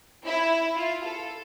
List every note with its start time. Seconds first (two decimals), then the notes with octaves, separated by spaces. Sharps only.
0.25 E4
0.75 F4
1.04 A4